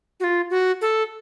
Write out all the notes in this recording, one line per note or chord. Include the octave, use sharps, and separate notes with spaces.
F#4
F4
F#4
A4